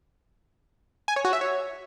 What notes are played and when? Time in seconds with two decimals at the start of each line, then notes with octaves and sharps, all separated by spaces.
1.08 G#5
1.16 C#5
1.25 F#4
1.33 E5
1.41 C#5